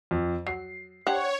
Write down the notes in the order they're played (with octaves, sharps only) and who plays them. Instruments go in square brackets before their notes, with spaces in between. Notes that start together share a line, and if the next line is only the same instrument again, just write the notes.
[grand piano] F2
[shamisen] F#3 [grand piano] C7
[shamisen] D4 G4 C5 [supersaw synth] C#5 [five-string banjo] F#5